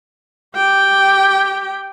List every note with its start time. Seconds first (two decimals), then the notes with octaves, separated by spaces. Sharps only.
0.55 G4 G5